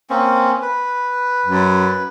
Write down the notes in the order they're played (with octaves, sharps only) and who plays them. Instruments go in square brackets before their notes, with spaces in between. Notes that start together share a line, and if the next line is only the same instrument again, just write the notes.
[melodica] A#3 C4 C#4
B4
[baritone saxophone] F#2